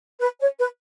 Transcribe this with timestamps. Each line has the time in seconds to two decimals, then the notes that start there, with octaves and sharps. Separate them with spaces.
0.21 B4
0.40 C#5
0.59 B4